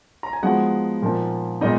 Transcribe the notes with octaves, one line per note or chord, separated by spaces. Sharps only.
A#5
G#5
F3 G#3 B3 D#4 F#4 F#5
A#2 F3 A#3 D#4
A#2 G#3 B3 D#4 D#5